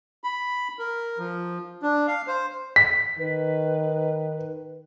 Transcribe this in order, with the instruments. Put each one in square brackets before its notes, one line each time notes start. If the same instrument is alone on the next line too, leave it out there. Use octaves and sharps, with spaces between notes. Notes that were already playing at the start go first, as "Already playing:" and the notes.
[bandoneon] B5
A#4
F3
D4
F5
C5
[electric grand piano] B6
[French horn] D#3 [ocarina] B4